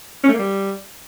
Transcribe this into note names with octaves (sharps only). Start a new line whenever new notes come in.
C#4
A3
A#3
G3